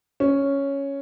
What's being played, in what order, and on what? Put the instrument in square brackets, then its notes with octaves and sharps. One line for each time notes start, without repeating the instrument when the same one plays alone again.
[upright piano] C#4